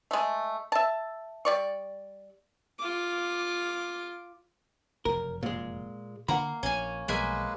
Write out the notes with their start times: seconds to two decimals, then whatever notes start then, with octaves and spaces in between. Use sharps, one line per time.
0.11 G#3 A3
0.72 E5 A5
1.45 G3 D5 C#6
2.79 F4 D6
5.05 F1 F#2 C#3 A#4
5.43 A#2 G#3
6.28 D3 A#3 D4 F#5 A#5 B5
6.63 A#1 A#2 C#4 G#5
7.08 B1 F3 G3 G#3 A#3 B4 E5 G#5